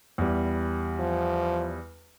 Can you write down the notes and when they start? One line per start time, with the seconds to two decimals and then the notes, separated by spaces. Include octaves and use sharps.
0.18 E2 G3
1.00 F3